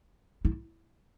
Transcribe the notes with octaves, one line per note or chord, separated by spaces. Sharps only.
E4